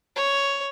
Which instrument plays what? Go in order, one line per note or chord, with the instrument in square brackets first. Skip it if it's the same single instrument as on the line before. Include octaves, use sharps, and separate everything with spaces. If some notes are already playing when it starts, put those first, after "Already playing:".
[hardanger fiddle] C#5